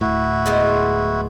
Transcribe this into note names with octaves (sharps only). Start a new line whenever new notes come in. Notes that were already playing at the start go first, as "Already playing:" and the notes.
D1 A2 E4 F#4
G#3 B3 C5